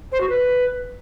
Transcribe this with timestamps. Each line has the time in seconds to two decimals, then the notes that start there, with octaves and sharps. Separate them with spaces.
0.12 C5
0.21 F#4
0.29 B4